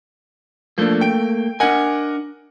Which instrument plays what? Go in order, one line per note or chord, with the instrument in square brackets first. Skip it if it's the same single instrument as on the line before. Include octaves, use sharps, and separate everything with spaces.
[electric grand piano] F3 D4 [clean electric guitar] A3 A#3
[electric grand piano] G5 D7
[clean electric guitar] D4 G#5 [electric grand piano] A#4 D#5 F#5